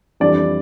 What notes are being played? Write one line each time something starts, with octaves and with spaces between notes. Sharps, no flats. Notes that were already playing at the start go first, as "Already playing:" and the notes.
F2 E3 G3 D4 D5